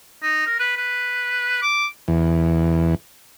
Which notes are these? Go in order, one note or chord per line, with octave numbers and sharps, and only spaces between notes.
D#4
A#4
B4
B4
D6
E2